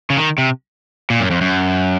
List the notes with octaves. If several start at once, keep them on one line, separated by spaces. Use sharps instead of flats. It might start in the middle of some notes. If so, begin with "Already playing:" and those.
C#3
D#3
C3
A#2
F#2
F2
F#2